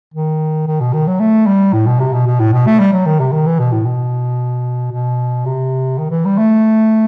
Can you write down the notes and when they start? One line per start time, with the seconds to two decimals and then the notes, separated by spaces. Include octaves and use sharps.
0.14 D#3
0.67 D#3
0.80 B2
0.93 D#3
1.07 F#3
1.20 A3
1.47 G3
1.73 A2
1.87 B2
2.00 C3
2.13 B2
2.26 B2
2.40 A2
2.53 B2
2.66 A3
2.79 G3
2.92 F#3
3.06 D#3
3.19 C3
3.32 D#3
3.46 E3
3.59 B2
3.72 A2
3.85 B2
4.92 B2
5.45 C3
5.98 D#3
6.11 E3
6.25 G3
6.38 A3